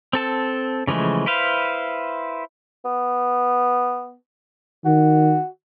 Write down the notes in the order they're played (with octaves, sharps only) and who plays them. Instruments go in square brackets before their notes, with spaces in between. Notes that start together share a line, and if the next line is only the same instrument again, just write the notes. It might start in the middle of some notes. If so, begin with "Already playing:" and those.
[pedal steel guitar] C4 A4 A5
C#3 E3 F3 G#3 A3
E4 B4 C5 F5
[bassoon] B3
[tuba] D#3 [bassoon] F#4